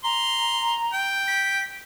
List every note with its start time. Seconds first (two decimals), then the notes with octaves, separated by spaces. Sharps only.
0.04 A#5 C6
0.93 G5
1.28 B6